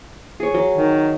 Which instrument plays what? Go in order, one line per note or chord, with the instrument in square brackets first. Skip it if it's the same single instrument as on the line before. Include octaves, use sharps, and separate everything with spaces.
[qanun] G#4 C#5
F#3
[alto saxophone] D#3